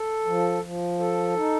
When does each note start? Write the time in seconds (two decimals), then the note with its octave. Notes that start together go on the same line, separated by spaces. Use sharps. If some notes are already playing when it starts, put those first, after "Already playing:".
Already playing: A4
0.26 F3
0.63 F3
0.99 A4
1.36 D#4